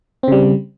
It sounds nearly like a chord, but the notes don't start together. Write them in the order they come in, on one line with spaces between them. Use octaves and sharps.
C4 C#3 G3